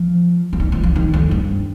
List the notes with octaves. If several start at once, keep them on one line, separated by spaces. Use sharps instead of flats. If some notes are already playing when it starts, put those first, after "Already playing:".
Already playing: F3
F3
D#3
F3
F3
D#3
F2
G2